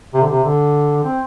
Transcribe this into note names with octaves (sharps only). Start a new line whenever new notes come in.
C3
D3
C3
D3
C4